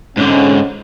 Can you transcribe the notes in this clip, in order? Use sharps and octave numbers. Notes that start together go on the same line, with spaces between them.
G#2 D3 G#3 C4 C#4